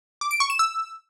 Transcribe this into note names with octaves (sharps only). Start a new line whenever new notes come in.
D6
D7
C#6
E7
E6